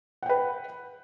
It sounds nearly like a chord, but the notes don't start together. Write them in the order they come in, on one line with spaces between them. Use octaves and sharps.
F#5 G5 B4